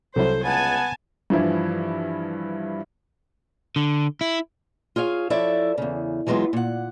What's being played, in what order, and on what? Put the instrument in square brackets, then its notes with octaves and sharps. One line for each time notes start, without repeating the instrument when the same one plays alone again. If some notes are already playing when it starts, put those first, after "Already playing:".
[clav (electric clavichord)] C2 F#3 E4 [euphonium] A4 [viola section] C5
[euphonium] C#2 [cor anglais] B3 [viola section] G#5 A5
[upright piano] G2 E3 F3 E4
[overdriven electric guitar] D3
E4
[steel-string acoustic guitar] F4 G#4 C#5 F5
F3 E4 A4 C#5 D5 E5
E2 C#3
E3 F#3 G#3 B3 F4
A#2 F#5